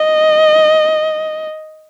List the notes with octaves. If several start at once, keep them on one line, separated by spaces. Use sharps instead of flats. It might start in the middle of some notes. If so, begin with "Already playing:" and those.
Already playing: D#5